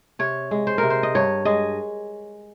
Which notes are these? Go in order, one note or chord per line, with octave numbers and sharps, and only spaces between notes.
C3 C#5
G#3
C5
C3 A#4
C5
D#5
G2 C#5
G#3 D#5